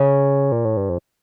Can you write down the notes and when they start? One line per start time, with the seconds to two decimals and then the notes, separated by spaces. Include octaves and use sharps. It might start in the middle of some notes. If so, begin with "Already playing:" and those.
Already playing: C#3
0.52 A#2
0.65 A2
0.77 G2
0.89 F2